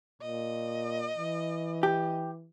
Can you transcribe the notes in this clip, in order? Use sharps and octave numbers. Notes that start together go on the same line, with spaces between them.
A#2 D#5
E3
G4